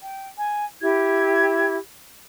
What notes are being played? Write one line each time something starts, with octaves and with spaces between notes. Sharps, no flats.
G5
G#5
E4 G4 G#6